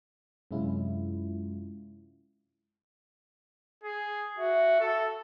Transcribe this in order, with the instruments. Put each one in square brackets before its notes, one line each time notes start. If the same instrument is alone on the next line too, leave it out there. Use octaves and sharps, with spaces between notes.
[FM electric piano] F#2 C3 G#3 C#4 E4 F4
[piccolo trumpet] G#4
[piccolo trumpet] F#4 [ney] E5
[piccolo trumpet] A4